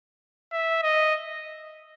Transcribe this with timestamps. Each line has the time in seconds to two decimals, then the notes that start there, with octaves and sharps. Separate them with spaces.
0.52 E5
0.83 D#5